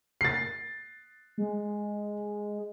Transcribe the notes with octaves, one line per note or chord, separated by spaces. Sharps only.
A6 C7
G#3